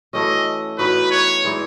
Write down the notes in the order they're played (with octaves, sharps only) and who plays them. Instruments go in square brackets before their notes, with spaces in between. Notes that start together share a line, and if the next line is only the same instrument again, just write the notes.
[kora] E3 A3 C#4 F#4 [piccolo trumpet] D#5
[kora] E3 B3 D#4 F#4 [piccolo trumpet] B4
[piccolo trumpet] C#5
[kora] E3 G#3 D#4